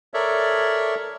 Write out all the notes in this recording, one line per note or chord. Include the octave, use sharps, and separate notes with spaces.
A4 A#4 C#5 D5 E5